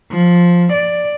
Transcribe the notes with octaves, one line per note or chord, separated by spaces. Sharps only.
F3
D5